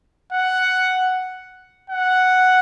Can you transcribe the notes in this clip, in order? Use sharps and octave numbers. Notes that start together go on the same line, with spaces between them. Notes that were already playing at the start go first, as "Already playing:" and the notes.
F#5
F#5